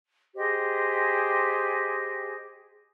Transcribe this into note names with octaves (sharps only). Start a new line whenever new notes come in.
G4 G#4 C5 D#5